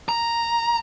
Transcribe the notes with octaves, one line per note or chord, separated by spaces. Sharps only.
A#5